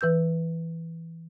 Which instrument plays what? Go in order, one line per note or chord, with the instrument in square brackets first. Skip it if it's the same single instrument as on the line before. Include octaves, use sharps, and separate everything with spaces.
[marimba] E3 B4 E6 G6